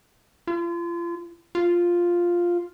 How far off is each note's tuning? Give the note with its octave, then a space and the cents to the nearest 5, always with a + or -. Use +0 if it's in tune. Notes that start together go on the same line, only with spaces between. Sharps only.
F4 -35
F4 +0